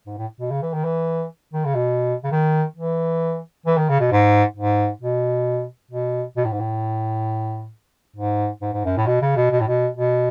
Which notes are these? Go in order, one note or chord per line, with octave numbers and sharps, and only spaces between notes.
G#2
A2
B2
C#3
E3
D#3
E3
D#3
C#3
B2
C#3
D#3
E3
E3
D#3
C#3
B2
G#2
G#2
B2
B2
B2
A2
G#2
A2
G#2
G#2
G#2
F#2
A2
B2
C#3
B2
B2
A2
B2
B2